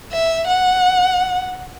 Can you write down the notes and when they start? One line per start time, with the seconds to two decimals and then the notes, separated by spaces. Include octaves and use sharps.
0.12 E5
0.47 F#5